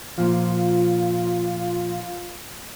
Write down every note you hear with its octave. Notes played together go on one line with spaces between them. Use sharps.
A#2 F3 F4